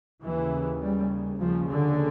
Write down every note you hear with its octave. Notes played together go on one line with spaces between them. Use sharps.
D#2 C#3 E3
G3
D#2 C#3 F3
D3